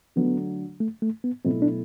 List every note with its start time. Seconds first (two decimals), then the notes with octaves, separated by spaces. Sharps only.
0.16 D3 F#3 A3 B3
0.80 A3
1.02 A3
1.24 B3
1.45 B2 F#3 A3 C4 E4
1.62 D4